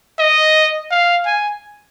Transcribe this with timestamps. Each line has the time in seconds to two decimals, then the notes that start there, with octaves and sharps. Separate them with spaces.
0.19 D#5
0.91 F5
1.26 G#5